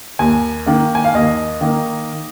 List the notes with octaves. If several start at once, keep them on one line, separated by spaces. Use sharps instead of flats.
D#2 G#5
D#3 A#3
G#5
F5
D#2 D#5
D#3 A#3